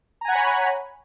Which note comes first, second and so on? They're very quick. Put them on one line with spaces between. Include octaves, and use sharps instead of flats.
A#5 G#5 F#5 B5 C#5